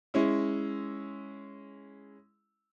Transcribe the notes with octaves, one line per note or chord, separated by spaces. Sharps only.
G#3 C#4 E4